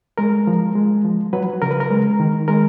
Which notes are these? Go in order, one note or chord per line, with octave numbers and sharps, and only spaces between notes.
G#3 A#4
F3
G#3
F3
F#3 B4
C#3 A#4
B4
A#4
G#3
D#3
G#3 A#4